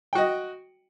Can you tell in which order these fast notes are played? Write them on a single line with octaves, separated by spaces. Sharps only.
G5 F#4 D#5